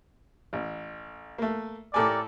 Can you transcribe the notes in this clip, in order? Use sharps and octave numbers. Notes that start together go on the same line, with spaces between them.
A1
A3 A#3
A2 G4 A4 A#4 D5 G#5